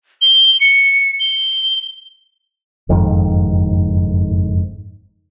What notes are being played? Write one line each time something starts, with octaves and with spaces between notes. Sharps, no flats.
G7
C#7
G7
F#1 F2 G#2 D#3